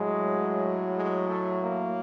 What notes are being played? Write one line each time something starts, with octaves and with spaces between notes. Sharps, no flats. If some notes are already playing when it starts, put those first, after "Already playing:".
Already playing: A2 F#3 G#3
G#3
A3
A#3